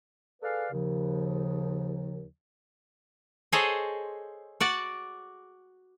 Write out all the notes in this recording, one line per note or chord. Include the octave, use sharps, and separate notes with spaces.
G#4 A4 B4 D5 F5
D#2 C#3 F3
G#4 A4 C5 C#5 D#5
F#4 D5 F#5